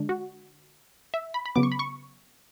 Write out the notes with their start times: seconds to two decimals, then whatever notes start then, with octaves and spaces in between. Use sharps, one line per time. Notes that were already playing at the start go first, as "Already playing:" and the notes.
Already playing: D3 G#3 D4
0.09 F#4
1.14 E5
1.34 B5
1.46 B5
1.56 C#3 F#3 B3 D6
1.63 C#6
1.72 B5
1.79 C#6